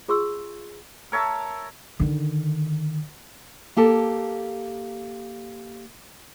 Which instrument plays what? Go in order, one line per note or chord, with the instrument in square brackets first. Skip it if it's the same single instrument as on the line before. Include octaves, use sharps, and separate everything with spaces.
[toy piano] F4 G#4 C6 C#6 E6
[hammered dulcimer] A#4 C#5 E5 A5
[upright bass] D3 D#3
[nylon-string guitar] A#3 G4 A4 A5